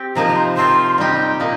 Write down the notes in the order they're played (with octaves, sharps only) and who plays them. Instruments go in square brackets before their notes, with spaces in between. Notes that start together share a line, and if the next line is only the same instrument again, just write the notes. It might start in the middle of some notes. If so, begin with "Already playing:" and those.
Already playing: [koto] C4 G4
[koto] C3 F3 A#3 D#4 [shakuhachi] A#5
[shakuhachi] A#5
C6
[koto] F3 C4 F4 [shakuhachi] C6
[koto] G3 D#4 G4
A#2 A#3 D#4